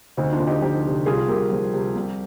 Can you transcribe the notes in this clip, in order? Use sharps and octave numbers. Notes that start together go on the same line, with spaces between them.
D2 C4 D#4
D4 F4
D2
D#4 G4
F3 D#4 G4
C3
C2 F4 G#4
C2 G4 A#4
F3
C3
C2